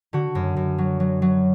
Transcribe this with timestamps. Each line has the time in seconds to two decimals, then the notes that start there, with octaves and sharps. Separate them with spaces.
0.13 D3 F#4
0.35 F#2
0.56 F#2
0.78 F#3
1.00 F#3
1.22 F#3